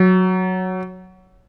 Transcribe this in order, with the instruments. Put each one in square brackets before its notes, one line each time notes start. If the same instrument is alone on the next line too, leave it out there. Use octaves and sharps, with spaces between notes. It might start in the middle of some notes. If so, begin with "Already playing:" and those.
Already playing: [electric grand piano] F#3